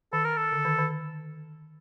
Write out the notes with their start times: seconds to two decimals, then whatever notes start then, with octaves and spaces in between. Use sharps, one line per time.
0.13 D#3 A4
0.25 A#4
0.37 A4
0.52 D3
0.65 D#3
0.79 D#3